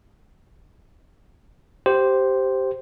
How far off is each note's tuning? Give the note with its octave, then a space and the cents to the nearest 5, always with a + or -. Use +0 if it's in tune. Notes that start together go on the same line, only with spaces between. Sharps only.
G4 -10 C5 +0